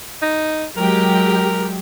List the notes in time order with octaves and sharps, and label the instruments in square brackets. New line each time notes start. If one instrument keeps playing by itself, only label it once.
[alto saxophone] D#4
[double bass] F#3 [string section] G#3 G4 [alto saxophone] A#4